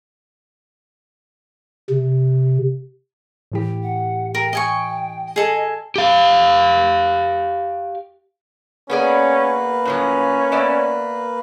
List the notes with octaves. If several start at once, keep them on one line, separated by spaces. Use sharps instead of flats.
C3
A2 E3 G4
F#5
A#4 G5
D#5 G5 G#5 C#6
G#4 A4 D#5 G#5
G4 F5
A#3 B3 C#4 G#4 B4 D5
A2 F3 F#3 C#4
B3 D5 E5